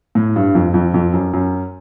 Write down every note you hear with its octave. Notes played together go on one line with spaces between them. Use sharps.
A2
G2
F2
F2
F2
F#2
F#2